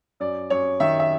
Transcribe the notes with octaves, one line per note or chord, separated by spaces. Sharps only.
F#2 D5
F#2 C#5
D#3 E5
E5